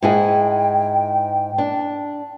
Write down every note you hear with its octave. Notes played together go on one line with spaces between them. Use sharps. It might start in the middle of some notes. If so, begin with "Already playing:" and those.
G#2 E4 G#4 G5
D4